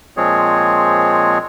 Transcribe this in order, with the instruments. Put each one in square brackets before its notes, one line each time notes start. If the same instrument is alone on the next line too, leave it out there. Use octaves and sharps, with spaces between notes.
[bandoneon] A#2 F3 G#3 C4 G#4 C#5